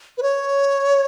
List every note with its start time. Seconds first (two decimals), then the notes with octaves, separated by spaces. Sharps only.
0.18 B4
0.22 C#5